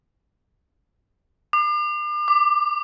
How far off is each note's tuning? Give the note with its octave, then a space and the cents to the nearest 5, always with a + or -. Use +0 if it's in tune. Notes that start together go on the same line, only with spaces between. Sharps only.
D6 +40
D6 +10